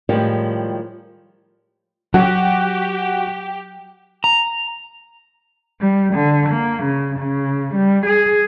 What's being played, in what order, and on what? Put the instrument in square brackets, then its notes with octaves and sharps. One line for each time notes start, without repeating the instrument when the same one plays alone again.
[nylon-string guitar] A2 D#3 F3 G3 G#3 G4
[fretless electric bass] F#3 [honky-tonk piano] F#4 [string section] G4
[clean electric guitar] A#5
[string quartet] G3
D3
A#3
C#3
C#3
G3
G#4